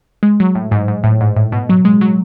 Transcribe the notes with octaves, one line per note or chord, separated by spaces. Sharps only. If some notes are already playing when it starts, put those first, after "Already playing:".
G#3
F#3
A2
G#2
G#2
A2
G#2
A2
B2
F#3
G#3
F#3